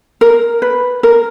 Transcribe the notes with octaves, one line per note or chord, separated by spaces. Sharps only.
A#4
B4
A#4